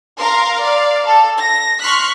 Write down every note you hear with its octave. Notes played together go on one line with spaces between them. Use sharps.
A#4 F5 A#5 C6
D5 F5
A4
A#6
C6 C#6 F6 F#6 B6